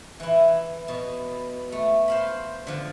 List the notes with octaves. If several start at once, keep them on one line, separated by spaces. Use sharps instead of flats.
E3 E4
B2
A3
C5 F5 B5
D3 F3